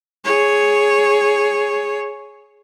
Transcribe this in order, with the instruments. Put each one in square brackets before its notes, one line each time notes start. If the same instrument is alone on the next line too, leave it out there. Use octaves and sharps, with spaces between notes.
[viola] G#4 C#5